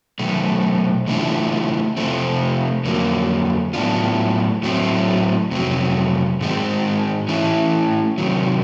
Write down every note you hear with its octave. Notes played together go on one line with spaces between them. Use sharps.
B2 F#3 A3
C#3 E3 A3 D4 F4
C3 F3 A3 C4
F2 D3 F#3 A#3
A2 F#3 B3 D4 F4
A2 F#3 A3 C4
F2 C3 F#3
G#2 D#3 G#3 C4 D#4
E3 A3 C#4 E4
C3 D#3 F#3